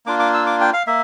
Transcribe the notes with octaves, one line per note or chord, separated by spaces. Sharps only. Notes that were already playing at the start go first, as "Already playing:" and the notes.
A#3 D4 F4 D6
D6
E6
D6
G5
F5
A#3 E5